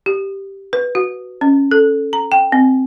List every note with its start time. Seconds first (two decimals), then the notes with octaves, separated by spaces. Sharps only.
0.06 G4
0.73 B4
0.95 F#4
1.41 C#4
1.71 A4
2.13 A#5
2.32 G5
2.52 C4